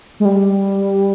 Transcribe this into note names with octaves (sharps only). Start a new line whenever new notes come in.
G#3
G3